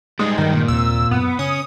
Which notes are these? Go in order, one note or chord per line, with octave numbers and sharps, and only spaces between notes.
G3 G#3 D#4
G2 D#3 G#3
A#2
D#2 C3 C4 E6
F#2 C3 B3
C#3 C#4 D#6